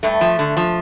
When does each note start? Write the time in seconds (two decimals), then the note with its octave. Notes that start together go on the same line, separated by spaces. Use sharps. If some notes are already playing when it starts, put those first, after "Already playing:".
0.03 G2 A3
0.21 F3
0.39 D3
0.57 F3